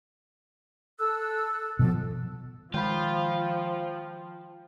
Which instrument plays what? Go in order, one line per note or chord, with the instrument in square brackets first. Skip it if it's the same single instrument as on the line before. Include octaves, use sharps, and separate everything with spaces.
[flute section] A4 E6 F#6
[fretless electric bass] B2 E3 F3 [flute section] A4
[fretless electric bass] D#3 G#3 [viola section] F3 [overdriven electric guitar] F4 [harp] G5 B5